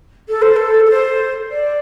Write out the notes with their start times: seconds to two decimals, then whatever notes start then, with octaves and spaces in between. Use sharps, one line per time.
0.29 A4
0.41 C5
0.56 A4
0.86 A4
0.90 C5
1.51 D5